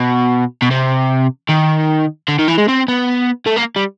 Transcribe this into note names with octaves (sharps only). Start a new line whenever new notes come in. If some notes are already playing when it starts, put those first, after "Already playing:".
Already playing: B2
B2
C3
D#3
D3
D#3
E3
G#3
C4
B3
A3
A#3
G3